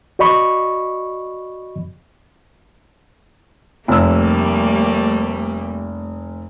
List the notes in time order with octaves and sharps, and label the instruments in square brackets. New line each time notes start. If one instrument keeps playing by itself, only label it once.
[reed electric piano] F#4 D5 D#5 B5 C#6
[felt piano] F1 E6 [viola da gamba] G3 A3 A#3